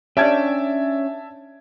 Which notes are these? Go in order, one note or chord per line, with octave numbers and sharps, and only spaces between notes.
C#4 D4 G4 E5 A5 G#6